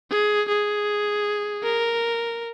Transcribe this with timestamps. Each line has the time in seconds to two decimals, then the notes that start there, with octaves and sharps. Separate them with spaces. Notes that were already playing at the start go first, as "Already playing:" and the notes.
0.10 G#4
0.48 G#4
1.64 A#4